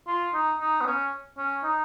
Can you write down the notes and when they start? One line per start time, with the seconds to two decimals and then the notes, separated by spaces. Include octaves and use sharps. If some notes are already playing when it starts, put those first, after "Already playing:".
0.08 F4
0.34 D#4
0.60 D#4
0.81 B3
0.87 C#4
1.38 C#4
1.64 D#4